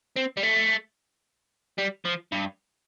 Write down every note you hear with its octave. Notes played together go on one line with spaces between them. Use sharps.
C4
G3
A3
G3
F3
G2